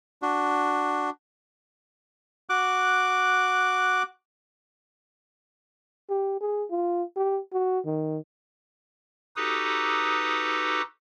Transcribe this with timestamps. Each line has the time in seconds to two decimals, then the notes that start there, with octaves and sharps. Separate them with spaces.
0.22 D4 F#4
2.50 F#4 D6 F#6
6.10 G4
6.41 G#4
6.71 F4
7.17 G4
7.53 F#4
7.86 D#3
9.36 D#4 F#4 G4 A4 B4 D#6